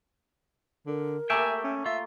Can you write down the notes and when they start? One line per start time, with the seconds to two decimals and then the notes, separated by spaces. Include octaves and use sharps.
0.87 D3 A#4
1.30 A3 A#3 G4 E5 G5 G#5
1.64 C#4
1.86 F4 E5